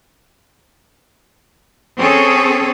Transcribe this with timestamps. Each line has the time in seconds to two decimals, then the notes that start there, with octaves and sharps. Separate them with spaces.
1.98 C4 C#4 G#4 A4 C#5